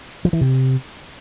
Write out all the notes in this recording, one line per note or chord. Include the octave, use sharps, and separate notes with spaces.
F3
E3
C3